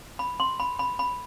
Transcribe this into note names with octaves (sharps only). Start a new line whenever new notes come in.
B5
C6
B5
B5
B5